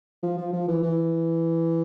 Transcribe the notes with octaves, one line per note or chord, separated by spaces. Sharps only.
F3
F3
F3
E3
E3